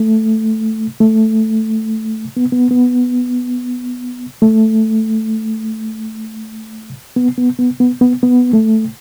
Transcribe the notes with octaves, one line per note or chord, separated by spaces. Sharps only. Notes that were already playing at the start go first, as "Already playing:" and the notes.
Already playing: A3
A3
B3
B3
B3
A3
B3
B3
B3
B3
B3
B3
A3